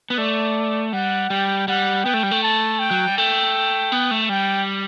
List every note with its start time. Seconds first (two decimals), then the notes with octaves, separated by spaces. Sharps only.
0.10 B3
0.18 A3 D5
0.93 G3 F#5
1.30 G3 G5
1.68 G3 F#5
2.04 B3 G5
2.14 A3
2.23 G3
2.31 A3
2.43 A5
2.79 G5
2.91 F#3
3.04 G3
3.17 A3 G5
3.92 B3
4.11 A3
4.29 G3 G5